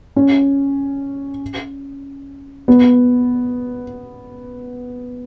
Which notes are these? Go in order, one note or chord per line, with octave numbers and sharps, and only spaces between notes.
C#4
B3